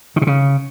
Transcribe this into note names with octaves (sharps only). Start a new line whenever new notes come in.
D#3
C3
C#3